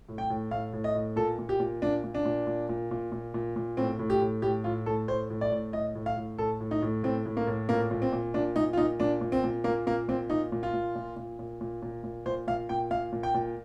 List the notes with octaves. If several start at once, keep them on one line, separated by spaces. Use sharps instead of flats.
A2
G5
A2
A2 F5
A2
D#5
A2
A#2 A4
A#2
G4
A#2
A#2 D4
A#2
D4
A#2
A#2
A#2
A#2
A#2
A#2
A#2
A2 C4
A2
G4
A2
A2 G4
A2 F4
A2 A4
A2 C5
A2
D5
A2
A2 D#5
A2
F5
A2
A2 A4
A2
D#4
A2
A2 C4
A2
A#3
A2
A#2 A#3
A#2
C4
A#2
A#2 D4
A#2 D#4
F4
A#2 D#4
A#2 D4
A#2
C4
A#2
A#2 A#3
A#2 A#3
A#2 C4
A#2 D#4
A#2
F4
A#2
A#2
A#2
A#2
A#2
A#2
A#2
A#2 C5
A#2 F5
A#2 G5
A#2 F5
A#2
G5
A#2